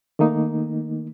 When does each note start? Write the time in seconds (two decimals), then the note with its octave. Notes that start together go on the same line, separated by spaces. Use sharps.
0.19 D#3 A3 A#3 D#4